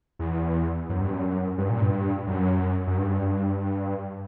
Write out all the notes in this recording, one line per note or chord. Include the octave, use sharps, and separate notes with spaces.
E2
F#2
G2
F#2
G2
A#2
G2
F#2
F#2
G2